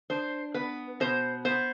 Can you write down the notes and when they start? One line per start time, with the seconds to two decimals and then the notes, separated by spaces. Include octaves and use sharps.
0.10 D4 C5
0.54 B3 B4
1.00 B2 C5
1.45 B3 C5